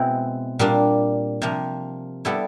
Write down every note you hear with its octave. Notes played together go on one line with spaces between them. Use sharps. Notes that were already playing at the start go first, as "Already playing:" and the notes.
Already playing: B2 G#3 C4 E4
A#2 G3 A#3 D4
C3 F3 A#3
G3 B3 E4 A4